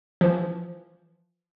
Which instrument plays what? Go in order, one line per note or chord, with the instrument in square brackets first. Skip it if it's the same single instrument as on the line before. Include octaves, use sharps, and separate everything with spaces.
[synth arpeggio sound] E3 F3